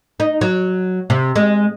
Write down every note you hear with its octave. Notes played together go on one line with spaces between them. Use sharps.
D#4
F#3
C3
G#3